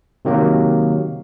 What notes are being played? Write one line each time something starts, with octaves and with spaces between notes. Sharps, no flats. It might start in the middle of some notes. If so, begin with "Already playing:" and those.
C3 D#3 F#3 A#3